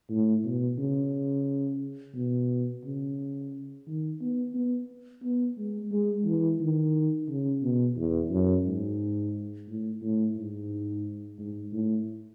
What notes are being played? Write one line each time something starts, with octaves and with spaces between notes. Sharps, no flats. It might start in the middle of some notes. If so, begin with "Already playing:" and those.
A2
B2
C#3
B2
C#3
D#3
B3
B3
B3
G#3
G#3
E3
D#3
C#3
B2
E2
F#2
G#2
A2
A2
G#2
G#2
A2